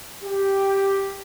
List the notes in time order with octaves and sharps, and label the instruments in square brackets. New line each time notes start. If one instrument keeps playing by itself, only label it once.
[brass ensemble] G4